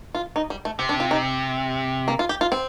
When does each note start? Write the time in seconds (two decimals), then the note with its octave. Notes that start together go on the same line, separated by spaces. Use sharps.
0.15 F4
0.36 D#4
0.50 G3
0.65 A3
0.79 C3 C4
0.89 D4
1.00 F4
1.11 D#4
2.08 A#3
2.19 F4
2.29 G4
2.41 F4
2.52 C4